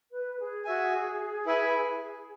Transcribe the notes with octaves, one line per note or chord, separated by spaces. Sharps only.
B4
G#4
F#4 E5 G#5
E4 B4 E5 G#5